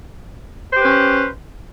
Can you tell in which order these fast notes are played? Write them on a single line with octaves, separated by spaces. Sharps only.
C5 G4 B4 C#4